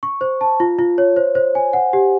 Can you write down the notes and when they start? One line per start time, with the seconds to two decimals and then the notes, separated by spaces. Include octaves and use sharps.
0.03 C#6
0.21 C5
0.41 A5
0.60 F4
0.79 F4
0.98 C#5
1.16 C5
1.35 C5
1.55 G#5
1.73 F#5
1.93 G4